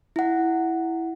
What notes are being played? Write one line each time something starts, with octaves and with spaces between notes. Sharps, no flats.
E4 F#5